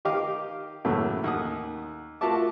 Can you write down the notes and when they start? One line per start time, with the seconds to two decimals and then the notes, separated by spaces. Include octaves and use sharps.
0.05 D#3 G4 D#5 F5 D6
0.85 E2 A2 C#3 F#3 A3 A#3
1.24 D#2 F#5 D#6
2.21 F4 F#4 A#4 E5 A5 D6